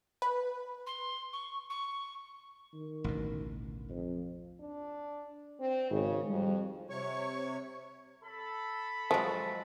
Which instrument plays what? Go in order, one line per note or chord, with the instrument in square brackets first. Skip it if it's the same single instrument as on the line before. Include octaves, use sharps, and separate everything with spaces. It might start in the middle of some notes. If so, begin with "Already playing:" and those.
[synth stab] B4
[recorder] C6
C#6
C#6
[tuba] D#3
[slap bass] A1 D2 B2
[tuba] F2
[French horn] D4
C4
[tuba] G#1 [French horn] C#3
[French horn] F2 [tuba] G3
[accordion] C3 C#5 C#6
[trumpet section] A4 B5
[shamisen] F3 [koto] F#3 G#3